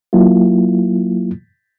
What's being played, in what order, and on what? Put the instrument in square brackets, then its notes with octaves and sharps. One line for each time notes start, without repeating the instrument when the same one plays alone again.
[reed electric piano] F#3 A#3 E4 F4